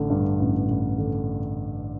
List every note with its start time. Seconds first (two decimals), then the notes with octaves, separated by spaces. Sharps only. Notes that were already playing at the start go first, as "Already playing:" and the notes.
Already playing: A1 D3
0.10 G2
0.40 A1
0.68 A1
0.98 D3